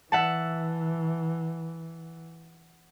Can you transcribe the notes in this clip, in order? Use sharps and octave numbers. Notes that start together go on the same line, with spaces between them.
E3 E5 F#5 A5